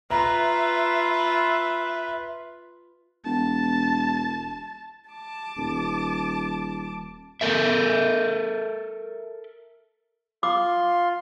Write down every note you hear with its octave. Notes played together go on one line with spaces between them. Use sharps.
F4 B4 E5 A#5
E1 A5
A5 D6
D#1
A4 A#4 E5
F4 C6 D6